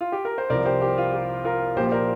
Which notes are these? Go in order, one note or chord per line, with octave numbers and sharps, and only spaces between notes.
F4
G4
A#4
C5
C2 C3 F3 A#4 D5
G4 C5
G4
F4
G4
F4 A#4
A#1 A#2 F3 G4 C5
C5
A#4 D5